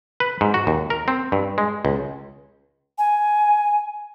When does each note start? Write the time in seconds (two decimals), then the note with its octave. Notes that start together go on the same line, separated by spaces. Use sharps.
0.20 B4
0.41 G#2
0.54 F#4
0.67 D#2
0.90 A#4
1.08 C4
1.32 G2
1.58 G#3
1.85 C#2
2.98 G#5